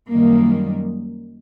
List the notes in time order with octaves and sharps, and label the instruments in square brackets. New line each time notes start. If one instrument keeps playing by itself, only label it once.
[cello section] F#2 D#3 G3 A#3